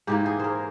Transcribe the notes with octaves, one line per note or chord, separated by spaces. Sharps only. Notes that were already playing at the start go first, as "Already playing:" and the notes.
G#2 E3 A#3 G4
G#4
A#4 C5